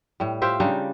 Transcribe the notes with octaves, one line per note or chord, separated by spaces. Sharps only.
A2 G3
F4 G4 C5 E5
C#3 G3 D4 D#4